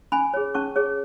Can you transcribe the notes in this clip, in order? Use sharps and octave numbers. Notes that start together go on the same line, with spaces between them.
C#4 G#5 B5
G#4 C#5
C#4 A5 C#6
G#4 C#5